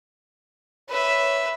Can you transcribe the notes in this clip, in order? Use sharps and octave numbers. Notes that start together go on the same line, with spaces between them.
B4 C#5 E5